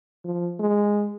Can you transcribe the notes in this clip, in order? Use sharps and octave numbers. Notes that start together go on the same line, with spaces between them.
F3
G#3